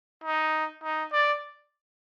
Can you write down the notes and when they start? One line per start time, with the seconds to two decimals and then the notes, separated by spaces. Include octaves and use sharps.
0.24 D#4
0.84 D#4
1.13 D5